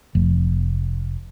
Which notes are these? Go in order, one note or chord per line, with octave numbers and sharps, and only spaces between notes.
F1